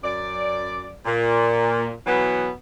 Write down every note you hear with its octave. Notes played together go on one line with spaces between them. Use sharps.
F#2 D5
A#2
B2 E3 F#3 B3